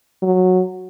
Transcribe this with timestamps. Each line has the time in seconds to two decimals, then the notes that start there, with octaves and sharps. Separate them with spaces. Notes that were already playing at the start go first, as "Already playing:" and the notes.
0.23 F#3